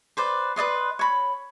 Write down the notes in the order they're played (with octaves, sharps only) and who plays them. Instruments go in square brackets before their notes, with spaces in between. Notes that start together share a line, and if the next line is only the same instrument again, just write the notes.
[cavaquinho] B4 C5 D5
B4 D5 D#5 C6
C#5 B5